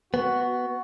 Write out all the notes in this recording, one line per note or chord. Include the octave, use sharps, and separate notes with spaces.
B3 F#4
F#4